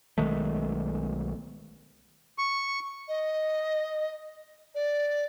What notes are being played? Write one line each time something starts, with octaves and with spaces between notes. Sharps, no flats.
B1 D#3 G#3 A3
C#6
D#5
D5